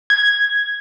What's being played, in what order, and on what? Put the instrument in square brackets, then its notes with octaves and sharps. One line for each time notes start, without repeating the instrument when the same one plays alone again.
[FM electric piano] G#6